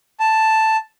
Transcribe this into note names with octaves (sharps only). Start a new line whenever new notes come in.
A5